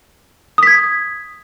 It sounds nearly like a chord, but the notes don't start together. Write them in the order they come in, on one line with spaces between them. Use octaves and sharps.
D#6 B6 G#6